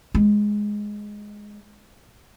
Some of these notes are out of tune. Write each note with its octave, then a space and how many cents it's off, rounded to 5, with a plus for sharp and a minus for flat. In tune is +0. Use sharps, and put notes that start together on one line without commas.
G#3 +0